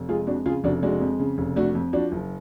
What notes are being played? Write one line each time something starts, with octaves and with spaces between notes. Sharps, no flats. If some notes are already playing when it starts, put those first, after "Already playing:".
Already playing: F1
G#3 F4 G#4
F2 D4 F#4
C#3 F4 G#4
F1 D4 F#4
G#3 D4 F#4
F2
C#3
F1
A3 D4 F#4
F2
F3 D4 F#4
F#1